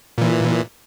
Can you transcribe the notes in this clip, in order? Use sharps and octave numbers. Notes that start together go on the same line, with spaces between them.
A#2 E3